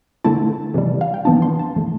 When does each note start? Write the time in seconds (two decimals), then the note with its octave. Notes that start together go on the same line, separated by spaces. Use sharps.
0.24 D3 A3 E4 A5
0.74 C3 E3 G3
1.01 F5
1.14 G5
1.25 E3 B3 D4 A5
1.42 C6
1.59 A5
1.76 E3 A3